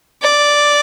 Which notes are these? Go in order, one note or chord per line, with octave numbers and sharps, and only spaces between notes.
D5